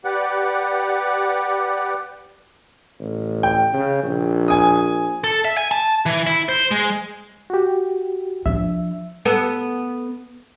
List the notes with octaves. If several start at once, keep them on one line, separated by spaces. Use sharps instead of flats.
G4 B4 D5 F#5
A1
G5
C#3
A#1
G#5 D#6
A4
E5
G#5
A5
E3
E4
C5
G#3
F#4 G4
F3 D4 E5
B3 A4